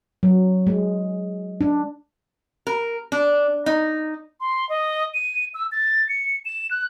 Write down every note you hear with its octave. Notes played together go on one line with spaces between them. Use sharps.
F#3
G#3
D4
A#4
D4
D#4
C6
D#5
D#7
E6
A6
C#7
E7
F#6